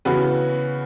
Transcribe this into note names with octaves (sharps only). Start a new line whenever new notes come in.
C#3 E3 B3 F#4 B4